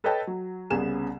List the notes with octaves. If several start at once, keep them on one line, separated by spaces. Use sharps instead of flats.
A4 B4 C#5 D#5 G5 A5
F#3
C2 C#3 B3 C#4 G#4 E7